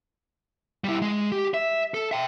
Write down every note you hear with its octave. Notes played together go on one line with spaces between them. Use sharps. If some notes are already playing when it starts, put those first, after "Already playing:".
G3 E4
G#3
G4
E5
A4
E5 G5